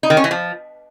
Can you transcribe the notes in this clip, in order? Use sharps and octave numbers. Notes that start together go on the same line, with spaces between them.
D#4
D#3
C#4
E3
F3